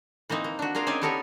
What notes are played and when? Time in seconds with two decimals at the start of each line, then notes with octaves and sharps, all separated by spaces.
0.29 E3 A#3 C4 D#4
0.44 A#3
0.59 D4 F#4
0.75 F4 G#4 A#4 D5 F5
0.87 C4 C#4 D#4 D5 E5 G#5
1.02 B3 G4 A4 A#4 C#5 G#5